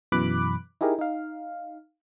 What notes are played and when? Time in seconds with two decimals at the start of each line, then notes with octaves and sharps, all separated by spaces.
0.12 F#2 B2 E3 B5 D6 F#6
0.81 D#4 E4 G4 G#4 A#4
0.99 D#4 F5